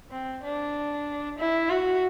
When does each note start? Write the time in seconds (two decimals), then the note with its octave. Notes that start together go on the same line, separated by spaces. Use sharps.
0.11 C4
0.43 D4
1.38 E4
1.69 F#4